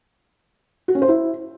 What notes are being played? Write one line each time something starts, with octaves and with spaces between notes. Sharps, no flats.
F#4
C#4
C5
E4